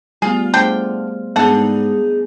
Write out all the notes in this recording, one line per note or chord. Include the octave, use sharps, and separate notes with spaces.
G3 A3 B3 F4 G#4
D3 A3 D4 G#4 C5 G5
G#2 B3 D4 D#4 G#4 A4 F#5